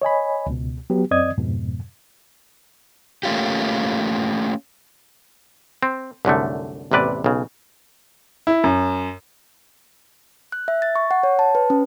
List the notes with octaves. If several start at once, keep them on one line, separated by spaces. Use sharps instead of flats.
C#5 D#5 G#5 B5
C#2 B2
F#3 B3 G4
F#2 C4 D5 D#5 D#6 G#6
F2 G#2 B2
A3 A#3 C#4 F4 G4
C4
C2 F#2 D3 A3
A1 E2 C3 B4 D5
B1 C#3
E4
F#2
F#6
E5
A6
C#6
F#5
C#5
A5
B4
C#4